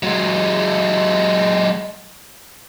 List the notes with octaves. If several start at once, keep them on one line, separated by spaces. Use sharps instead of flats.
F#3 G#3